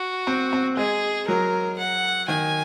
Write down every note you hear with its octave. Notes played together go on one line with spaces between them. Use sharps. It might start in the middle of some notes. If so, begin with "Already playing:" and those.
Already playing: F#4
C4
C4
G#3 G#4
F#3 A#4
F#5
D#3 G#5